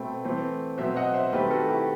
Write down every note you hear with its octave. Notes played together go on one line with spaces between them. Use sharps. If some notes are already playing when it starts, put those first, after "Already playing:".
Already playing: B2 A3 C4 G5 B5
E3 A3 C4
B2 F#3 C4 C5 E5
D#5 F#5
C5 E5
D#3 A3 C4 G4 B4
F#4 A4
E4 G4